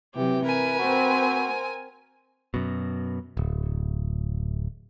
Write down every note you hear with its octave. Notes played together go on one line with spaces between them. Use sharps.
C3 E3 F#3 G4
A#4 B4 G#5
C4 F#4
F#2 B2
D1